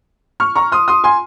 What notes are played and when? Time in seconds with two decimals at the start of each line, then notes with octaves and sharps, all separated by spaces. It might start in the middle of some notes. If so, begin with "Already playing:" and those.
0.40 C#6 F6
0.55 A#5 C#6
0.72 C6 D#6
0.88 C6 D#6
1.04 G#5 C6